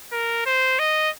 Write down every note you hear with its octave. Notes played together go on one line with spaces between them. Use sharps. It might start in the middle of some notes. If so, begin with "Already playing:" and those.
A#4
C5
D#5